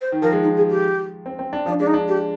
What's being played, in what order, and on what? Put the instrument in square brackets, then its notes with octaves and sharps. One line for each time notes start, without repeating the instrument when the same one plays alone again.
[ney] C5
[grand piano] D#3
[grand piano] F3 [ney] A#4
[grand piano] G#3
[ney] D#4
G#4
G4
[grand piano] C4
C4
D4
[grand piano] F3 [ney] D4
[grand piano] G#3 [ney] D4
[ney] D#4
[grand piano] D4
[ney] G4